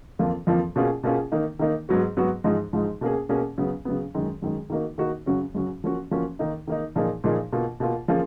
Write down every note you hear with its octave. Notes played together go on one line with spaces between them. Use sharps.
F2 F3 A#3 F4
F2 F3 A#3 F4
B2 A#3 C#4 F4 G#4
B2 A#3 C#4 F4 G#4
D#3 A#3 D#4
D#3 A#3 D#4
G#2 F#3 B3 F#4
G#2 F#3 B3 F#4
G#2 F3 G#3 D#4
G#2 F3 G#3 D#4
B2 A#3 C#4 G#4
B2 A#3 C#4 G#4
C#3 F#3 B3
C#3 F#3 B3
F#2 D#3 G#3
F#2 D#3 G#3
D#3 A#3 D#4 F#4
D#3 A#3 D#4 F#4
F#2 C#3 F#3 C#4 F#4
F#2 C#3 F#3 C#4 F#4
F3 A#3 C#4 F#4
F3 A#3 C#4 F#4
D#3 A#3 D#4
D#3 A#3 D#4
A#2 F3 A#3 D#4 G#4
A#2 F3 A#3 D#4 G#4
B2 A#3 F4
B2 A#3 F4
F3 A#3 C#4 F4 G#4